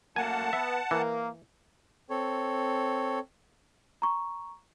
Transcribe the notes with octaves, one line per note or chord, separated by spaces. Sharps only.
F#2 A3 A#3 F#5 G#5 A5
B3 E5
E3 A#3 A#4
C4 A4 C#5
A#5 C#6